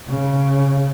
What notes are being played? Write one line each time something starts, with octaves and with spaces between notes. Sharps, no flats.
C#3